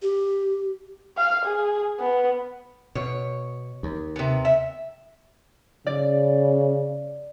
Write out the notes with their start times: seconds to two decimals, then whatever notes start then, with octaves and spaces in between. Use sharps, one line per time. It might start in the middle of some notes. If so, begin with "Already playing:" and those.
0.02 G4
1.17 F5
1.46 G#4
2.00 B3
2.95 B2 C#5
3.83 D#2
4.16 C3 B3
4.45 E5
5.86 C#3 D5